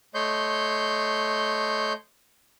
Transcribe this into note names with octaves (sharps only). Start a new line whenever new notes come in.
A3 C#5 D#5 C6 G6